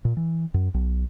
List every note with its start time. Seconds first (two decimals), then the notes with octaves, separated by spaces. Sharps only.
0.05 A#2
0.17 E3
0.54 F#2
0.74 B1